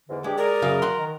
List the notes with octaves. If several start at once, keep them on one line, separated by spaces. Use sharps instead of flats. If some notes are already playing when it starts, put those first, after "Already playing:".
E2 G#2 D3
G#3 D4 G4
G#4 A#4 D5
F#2 C#3 F5
F#5 C6
D#3